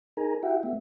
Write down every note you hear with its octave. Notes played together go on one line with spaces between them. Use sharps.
D#4 G#4 A#4 G#5 A#5
E4 F#4 G4 E5 F#5 G5
A3 B3 E5